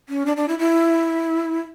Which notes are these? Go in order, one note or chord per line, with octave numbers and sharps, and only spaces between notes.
C#4
D4
D4
E4
E4